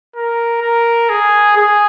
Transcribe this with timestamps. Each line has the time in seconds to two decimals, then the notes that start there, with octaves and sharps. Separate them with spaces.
0.16 A#4
0.62 A#4
1.09 G#4
1.57 G#4